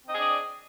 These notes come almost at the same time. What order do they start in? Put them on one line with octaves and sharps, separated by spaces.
C4 D#5 G#4 D4 D5